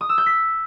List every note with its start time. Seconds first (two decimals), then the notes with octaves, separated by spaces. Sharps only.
0.01 D#6
0.09 E6
0.18 G6
0.26 B6